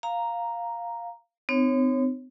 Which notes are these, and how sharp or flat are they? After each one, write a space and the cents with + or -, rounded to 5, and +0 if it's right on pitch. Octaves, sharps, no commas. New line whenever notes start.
F5 +0 A#5 +0
C4 -40 D#4 -30 C#5 -25